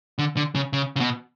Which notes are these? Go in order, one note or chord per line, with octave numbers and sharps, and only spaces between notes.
D3
D3
C#3
C#3
C#3
B2